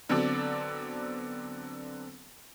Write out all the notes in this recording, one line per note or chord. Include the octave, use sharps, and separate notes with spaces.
D3 F#3 B3 C4 A4 D5